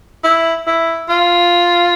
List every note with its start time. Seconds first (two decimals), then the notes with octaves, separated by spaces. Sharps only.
0.24 E4
0.67 E4
1.09 F4